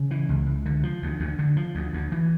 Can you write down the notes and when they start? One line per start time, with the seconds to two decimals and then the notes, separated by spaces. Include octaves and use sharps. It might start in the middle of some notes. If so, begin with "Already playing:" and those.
Already playing: C#3
0.11 E3
0.29 C#2
0.46 C#2
0.66 D3
0.83 F3
1.02 D2
1.20 D2
1.39 D3
1.57 F3
1.75 D2
1.93 D2
2.12 E3